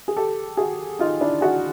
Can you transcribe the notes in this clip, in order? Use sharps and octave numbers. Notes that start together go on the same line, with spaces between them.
G#4
G4 A4
F#4 G#4
D#4 F4
D4 E4
F#4 G#4